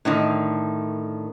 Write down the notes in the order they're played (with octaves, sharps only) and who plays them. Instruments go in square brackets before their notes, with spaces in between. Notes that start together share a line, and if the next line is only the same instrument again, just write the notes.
[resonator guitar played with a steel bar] A2 D3 D#3